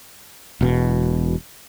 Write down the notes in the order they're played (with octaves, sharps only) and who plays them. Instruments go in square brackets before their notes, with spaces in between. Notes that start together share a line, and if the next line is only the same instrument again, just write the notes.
[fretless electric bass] E1 B2